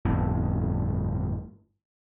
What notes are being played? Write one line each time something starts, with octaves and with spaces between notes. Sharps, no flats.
G1 F2 A2